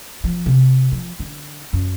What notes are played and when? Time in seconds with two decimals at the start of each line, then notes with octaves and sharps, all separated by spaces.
0.24 F3
0.46 C3
0.92 F3
1.20 D3
1.73 F#2